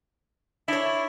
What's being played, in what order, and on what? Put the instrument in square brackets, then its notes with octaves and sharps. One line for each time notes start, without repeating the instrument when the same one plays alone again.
[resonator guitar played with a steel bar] D4 C#5 [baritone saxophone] E4